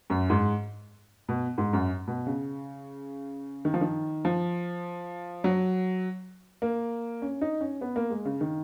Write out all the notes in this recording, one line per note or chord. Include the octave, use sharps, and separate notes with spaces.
F#2
G#2
B2
G#2
F#2
B2
C#3
D#3
F3
D#3
F3
F#3
A#3
C#4
D#4
C#4
B3
A#3
G#3
C#3
D#3